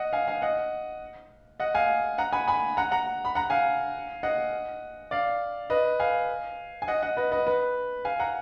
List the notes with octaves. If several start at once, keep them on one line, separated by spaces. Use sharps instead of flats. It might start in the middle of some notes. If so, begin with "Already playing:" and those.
Already playing: D#5 F#5
F5 G#5
F5 G#5
D#5 F#5
D#5 F#5
F5 G#5
F#5 A#5
G#5 B5
G#5 B5
F#5 A#5
F#5 A#5
B5
F#5 A#5
F5 G#5
D#5 F#5
D5 F5
B4 D#5
F5 G#5
G#5
D#5 F#5
D#5 F#5
B4 D#5
B4 D#5
B4
F5 G#5
F#5 A#5